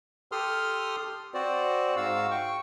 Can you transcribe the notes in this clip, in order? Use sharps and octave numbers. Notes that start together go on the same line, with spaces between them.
G4 A4 C6 D#6 F6
C4 F#4 C5 D5
G#2 F#4 F5 E6
G5 C#6